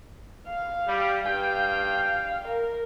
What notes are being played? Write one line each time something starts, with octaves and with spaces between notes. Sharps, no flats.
F5
G3
G2 F5 G5
A#4